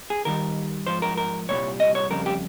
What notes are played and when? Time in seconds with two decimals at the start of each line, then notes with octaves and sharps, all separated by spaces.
0.10 G#4
0.25 D#2 D#3 G3 A#4
0.87 G#2 F3 C5
1.02 A#4
1.17 A#4
1.49 C2 A#2 G3 C#5
1.80 D#5
1.95 C#5
2.11 F2 C#3 G3 A#4
2.26 G4